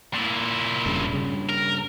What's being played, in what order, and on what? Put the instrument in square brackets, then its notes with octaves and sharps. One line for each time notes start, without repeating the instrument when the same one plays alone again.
[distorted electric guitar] A#2 E4
[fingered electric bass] E1 G2 C#3
G2 C#3
[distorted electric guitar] A#4